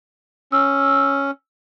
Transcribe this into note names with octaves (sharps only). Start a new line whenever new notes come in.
C#4 E6